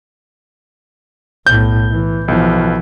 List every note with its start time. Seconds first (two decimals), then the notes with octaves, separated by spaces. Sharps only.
1.47 B1 A2 G6
1.90 E3
2.28 B1 E3 F3